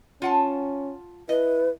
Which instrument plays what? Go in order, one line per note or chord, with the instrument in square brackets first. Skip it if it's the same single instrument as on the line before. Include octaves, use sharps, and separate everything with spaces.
[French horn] C#4 [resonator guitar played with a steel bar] F4 F#5 A5
[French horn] E4 [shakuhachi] B4 [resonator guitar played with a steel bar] D#5